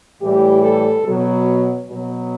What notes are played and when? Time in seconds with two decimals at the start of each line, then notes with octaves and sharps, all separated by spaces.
0.20 A2 E3 G3 G4
0.62 A4
1.04 B2 F#3
1.87 B2 F#3